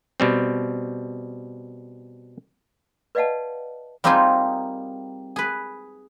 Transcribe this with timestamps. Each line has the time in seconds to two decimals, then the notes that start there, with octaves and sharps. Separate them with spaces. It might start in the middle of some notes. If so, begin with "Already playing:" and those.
0.20 B2 G3 C4
3.15 B4 D5 D#5 F5 F#5 A5
4.04 G3 A#3 C4 D#4 F4 G#4
5.36 G#4 B4